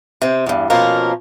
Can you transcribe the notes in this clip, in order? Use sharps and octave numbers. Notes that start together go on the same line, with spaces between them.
C3 C4
E2 G2
B2 F3 A#3 C#4 A#4